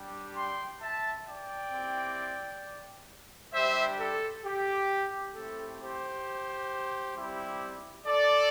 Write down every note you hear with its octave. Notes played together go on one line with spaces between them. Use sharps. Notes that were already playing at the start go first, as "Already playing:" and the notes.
Already playing: G3 D4 G4
G5 C6
E5 A5
D5 G5
C4 E4 G4
G3 D4 G4 C5 E5
A4
G4
A3 C4 E4 G4 A4
G4 C5
G3 C4 E4 G4
A4 D5